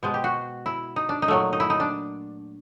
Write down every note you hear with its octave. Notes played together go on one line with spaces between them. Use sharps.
B2 G#3 C5
G4
F#4
E4
D#4
D4
D#4
A#2 F#3 A3
D#4
E4
D#4
D4